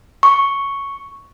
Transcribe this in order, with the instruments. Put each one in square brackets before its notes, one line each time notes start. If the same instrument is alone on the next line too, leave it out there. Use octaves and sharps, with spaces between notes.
[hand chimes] C#6